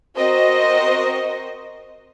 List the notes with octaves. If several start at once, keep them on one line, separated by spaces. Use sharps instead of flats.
C4 F#4 A#4 C5 D#5